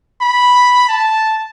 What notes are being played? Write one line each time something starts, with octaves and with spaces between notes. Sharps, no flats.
B5
A5